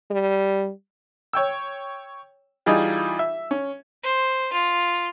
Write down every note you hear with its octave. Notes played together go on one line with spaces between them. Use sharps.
G3
C#5 G5 E6
E3 G3 D#4 F4 G#4 D#5
E5
C#4
C5
F4